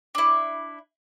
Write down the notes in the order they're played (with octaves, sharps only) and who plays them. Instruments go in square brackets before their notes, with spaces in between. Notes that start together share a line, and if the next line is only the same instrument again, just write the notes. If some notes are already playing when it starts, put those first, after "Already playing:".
[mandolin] D4 E4